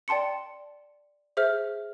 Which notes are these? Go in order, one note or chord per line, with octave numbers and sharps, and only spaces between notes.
D5 G5 A5 C6 C#7
G#4 C5 E5 F6